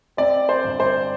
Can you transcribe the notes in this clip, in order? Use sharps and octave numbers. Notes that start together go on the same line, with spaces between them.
C4 D5
C5
G1
C5